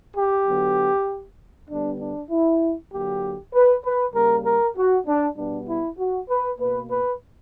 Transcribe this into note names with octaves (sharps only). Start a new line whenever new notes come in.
G4
D3 F#3 B3
D3 G3 B3 D4
D4
E4
D3 F#3 A#3 G4
B4
B4
C#3 G3 A#3 A#4
A#4
F#4
D4
B2 G3 B3 D4
E4
F#4
B4
B2 A#3 B4
B4